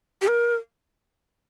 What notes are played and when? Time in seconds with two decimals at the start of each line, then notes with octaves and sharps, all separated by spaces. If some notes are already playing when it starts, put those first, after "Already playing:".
0.22 G4
0.28 A#4